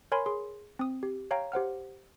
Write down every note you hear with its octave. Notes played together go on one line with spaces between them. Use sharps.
A#4 C#5 G#5 B5 C6
G#4 C6
C4 D#6
G4
C#5 F5 G5 A#5
G4 C5 F#5 F6